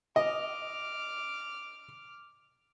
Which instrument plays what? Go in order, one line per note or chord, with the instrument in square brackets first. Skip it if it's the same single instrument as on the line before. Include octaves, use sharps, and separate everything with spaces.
[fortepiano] D#5 [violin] D6 F6